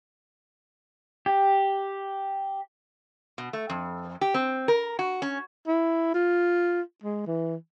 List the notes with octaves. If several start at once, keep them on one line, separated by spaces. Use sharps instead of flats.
G4
B2
A3
F2
G4
C4
A#4
F#4
C#4
E4
F4
G#3
E3